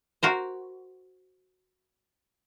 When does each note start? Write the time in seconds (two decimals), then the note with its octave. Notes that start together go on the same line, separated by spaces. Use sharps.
0.23 F#4 A#4 C5